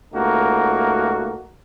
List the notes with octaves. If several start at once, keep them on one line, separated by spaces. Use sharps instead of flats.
C#2 A3 A#3 D#4 F#4